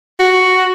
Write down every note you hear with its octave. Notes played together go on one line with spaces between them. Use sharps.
F#4